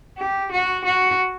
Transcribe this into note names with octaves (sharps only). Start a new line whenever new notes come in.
G4
F#4
F#4